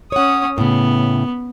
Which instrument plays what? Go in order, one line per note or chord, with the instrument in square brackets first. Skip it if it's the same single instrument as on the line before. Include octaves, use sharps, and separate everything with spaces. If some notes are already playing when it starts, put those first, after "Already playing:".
[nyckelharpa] C#4 D#6 [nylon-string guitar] C#5 F#5
[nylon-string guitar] A2 C#3 [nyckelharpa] B3